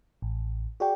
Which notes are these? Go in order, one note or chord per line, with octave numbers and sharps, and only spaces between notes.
A1
F#4 G#4 D5 G5